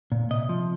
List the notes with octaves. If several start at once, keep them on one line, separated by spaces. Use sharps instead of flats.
A#2
C3 D#5
F3